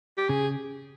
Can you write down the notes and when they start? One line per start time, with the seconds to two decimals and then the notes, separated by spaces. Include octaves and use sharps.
0.18 G4
0.29 C#3 G#4